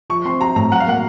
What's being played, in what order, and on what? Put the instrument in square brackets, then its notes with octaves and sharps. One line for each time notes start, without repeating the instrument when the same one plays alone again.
[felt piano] F3 [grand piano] C#6
[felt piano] C4 [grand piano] C6
[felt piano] F#4 [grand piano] A#5
[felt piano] A2 [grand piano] A#5
[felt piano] F#3 [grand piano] F#5
[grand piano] F5
[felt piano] A#3 [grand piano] F#5